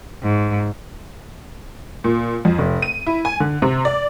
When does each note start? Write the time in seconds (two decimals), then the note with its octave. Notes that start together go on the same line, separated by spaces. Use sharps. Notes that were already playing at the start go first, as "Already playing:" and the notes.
0.23 G#2
2.04 A#2
2.45 F2
2.58 F1
2.82 D#7
3.06 E4
3.25 G#5
3.40 D3
3.62 C3
3.85 D5